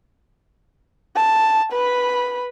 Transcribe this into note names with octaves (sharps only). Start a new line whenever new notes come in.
A5
B4 B5